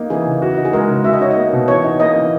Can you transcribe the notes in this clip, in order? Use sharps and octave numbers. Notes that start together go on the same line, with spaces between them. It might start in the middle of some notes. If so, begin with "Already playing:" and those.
Already playing: A#3 D#4
E3 G#4
C#3
F#4
D#4
G#4
G#3 A#4
C#3
F#4 E5
D#5
D#4 C#5
D#5
A#3
B2
E3 C#5
D#4
A#3 D#5
E3